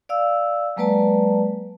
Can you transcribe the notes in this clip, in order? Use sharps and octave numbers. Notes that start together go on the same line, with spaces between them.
D5 F5 E6
F#3 G#3 A#3 B4 D5 A5